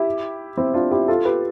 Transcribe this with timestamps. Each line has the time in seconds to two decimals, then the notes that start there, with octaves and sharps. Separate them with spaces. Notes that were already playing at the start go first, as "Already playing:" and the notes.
Already playing: E4 G4
0.57 C4 E4
0.74 D4 F4
0.91 E4 G4
1.08 F4 A4
1.25 G4 B4